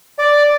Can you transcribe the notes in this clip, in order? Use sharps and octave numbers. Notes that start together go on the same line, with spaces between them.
D5